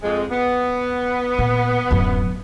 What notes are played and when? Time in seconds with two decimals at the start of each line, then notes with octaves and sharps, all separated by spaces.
0.02 F2 G#3
0.31 B3
1.39 A#2
1.91 D1 F#2